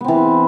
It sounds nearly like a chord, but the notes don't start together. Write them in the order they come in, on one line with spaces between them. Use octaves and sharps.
B3 C4 E3